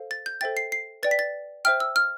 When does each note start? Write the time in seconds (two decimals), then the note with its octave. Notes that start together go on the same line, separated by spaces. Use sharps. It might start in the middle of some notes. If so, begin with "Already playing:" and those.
Already playing: A4 C5 F5
0.11 A6
0.26 G6
0.41 A4 C5 E5 G5 A6
0.57 C7
0.72 C7
1.03 B4 D5 G5 A6
1.11 B6
1.19 A6
1.65 C5 E5 G5 F6
1.80 E6
1.96 F6